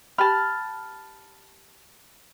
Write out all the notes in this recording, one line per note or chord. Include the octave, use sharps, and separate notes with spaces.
G4 A5 B5 F6